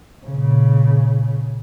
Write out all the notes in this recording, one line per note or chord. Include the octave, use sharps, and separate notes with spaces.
A#2 C#3